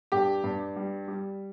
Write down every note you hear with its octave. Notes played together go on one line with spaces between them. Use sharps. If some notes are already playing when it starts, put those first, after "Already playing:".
G2 G4
G2
G3
G3